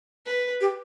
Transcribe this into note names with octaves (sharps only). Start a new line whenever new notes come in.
B4
G4